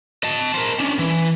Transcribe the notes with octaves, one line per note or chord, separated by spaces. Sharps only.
D#5 A5
A#4 C5
C#4 D4
E3